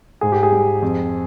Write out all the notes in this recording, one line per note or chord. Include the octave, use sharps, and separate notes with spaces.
G#2 G#4
G4
G#4
G3
F2